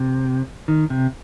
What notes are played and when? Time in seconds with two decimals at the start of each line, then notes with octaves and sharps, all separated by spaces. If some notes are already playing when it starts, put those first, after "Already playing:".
Already playing: C3
0.68 D#3
0.90 C3